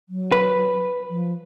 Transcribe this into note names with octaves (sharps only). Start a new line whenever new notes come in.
F#3
B4
F3